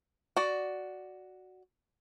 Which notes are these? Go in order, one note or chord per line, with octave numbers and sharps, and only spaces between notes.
F#4 D5